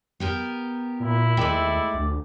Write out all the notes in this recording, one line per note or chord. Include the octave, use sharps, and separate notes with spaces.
B3 G4 A#4
A#2 E4
D#2 G#3 A3 D5 E5 G5
D2